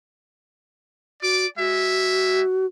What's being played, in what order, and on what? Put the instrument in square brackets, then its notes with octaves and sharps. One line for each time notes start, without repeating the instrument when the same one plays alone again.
[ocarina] F#4 [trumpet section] D5 D6
[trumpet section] G#3 E5 [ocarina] F#4